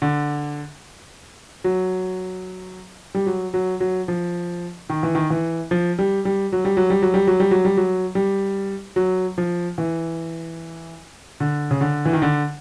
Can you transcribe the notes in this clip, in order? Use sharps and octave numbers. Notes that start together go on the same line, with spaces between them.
D3
F#3
G3
F#3
F#3
F#3
F3
D#3
E3
D#3
E3
F3
G3
G3
F#3
G3
F#3
G3
F#3
G3
F#3
G3
F#3
G3
F#3
G3
F#3
F3
E3
D3
C#3
D3
E3
D#3
D3